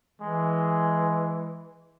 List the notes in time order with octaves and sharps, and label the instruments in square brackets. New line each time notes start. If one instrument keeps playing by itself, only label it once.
[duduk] E3 [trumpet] G#3